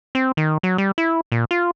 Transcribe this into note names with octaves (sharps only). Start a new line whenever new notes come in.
C4
D#3
F#3
G3
E4
A#2
F4